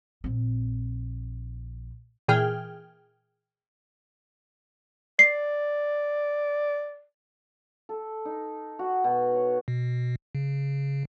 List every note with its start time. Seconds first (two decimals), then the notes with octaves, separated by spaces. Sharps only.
0.24 A#1 C4
2.28 A#2 E3 G#4 G5 F6
5.19 D5 C7
7.89 A4
8.25 D#4
8.79 F#4
9.04 B2
9.35 C#5
9.68 B2
10.35 C#3